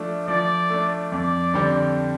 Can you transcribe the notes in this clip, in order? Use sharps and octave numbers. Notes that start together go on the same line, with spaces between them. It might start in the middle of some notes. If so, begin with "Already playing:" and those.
Already playing: F3 A3 D4
F3 D5
A3 D4
F2 D5
D3 G3 C4